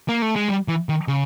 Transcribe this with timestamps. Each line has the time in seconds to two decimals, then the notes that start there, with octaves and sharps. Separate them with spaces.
0.09 A#3
0.22 A3
0.36 G#3
0.49 G3
0.68 E3
0.89 D#3
1.08 C#3